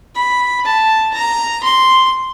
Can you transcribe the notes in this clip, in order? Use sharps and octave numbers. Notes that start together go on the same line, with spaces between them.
B5
A5
A#5
C6